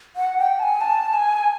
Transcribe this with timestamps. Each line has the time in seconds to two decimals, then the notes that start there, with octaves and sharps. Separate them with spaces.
0.16 F#5
0.38 G5
0.59 A5
0.63 G#5
0.81 A5
1.14 G#5